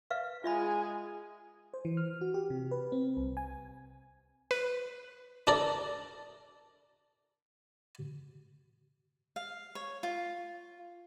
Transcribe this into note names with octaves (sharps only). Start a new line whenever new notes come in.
B4 E5 F5
G#3 F4 G#4 E5 B5
C5
E3
F6
F#4
G4
C3
B4
C4
C2
G#5
B4
D4 A4 A#4 D5
F5
C#5
F4